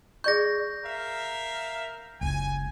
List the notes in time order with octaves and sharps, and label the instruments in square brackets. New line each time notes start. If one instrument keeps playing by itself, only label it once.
[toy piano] G#4 D5 C#6 [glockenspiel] G6 A#6
[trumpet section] A#4 E5 F5
[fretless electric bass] F#1 C#2 [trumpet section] G#5